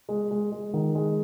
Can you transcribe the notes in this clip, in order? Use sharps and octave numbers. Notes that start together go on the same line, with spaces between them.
G#3
G#3
G#3
D#3
G#3